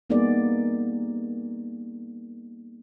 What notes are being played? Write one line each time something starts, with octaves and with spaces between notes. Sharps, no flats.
G3 A#3 B3 D#4 G#4 D5